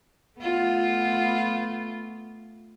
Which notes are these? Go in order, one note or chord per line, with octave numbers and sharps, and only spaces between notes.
A3 B3 F4